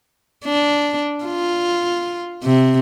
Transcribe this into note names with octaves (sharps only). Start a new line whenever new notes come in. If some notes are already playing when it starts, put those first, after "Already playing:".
D4
F4
C3